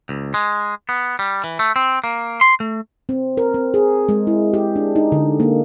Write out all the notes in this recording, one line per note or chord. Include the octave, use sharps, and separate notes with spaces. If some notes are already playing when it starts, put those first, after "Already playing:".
C#2
G#3
B3
G3
E3
A3
C4
A#3
C6
A3
C4
A#4
C4
G#4
G#3
E4
G4
D4
D#4
D3
A#3